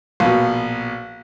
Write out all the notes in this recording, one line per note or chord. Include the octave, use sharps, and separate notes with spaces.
A#1 B2